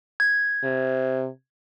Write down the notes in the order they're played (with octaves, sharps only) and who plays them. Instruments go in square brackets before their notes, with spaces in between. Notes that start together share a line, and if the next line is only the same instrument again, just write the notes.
[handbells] G#6
[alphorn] C3